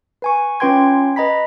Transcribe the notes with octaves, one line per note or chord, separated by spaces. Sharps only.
B4 G#5 C#6
C#4 F4 B4 G5 C6 G#6
B4 D#5 A#5 B5 B6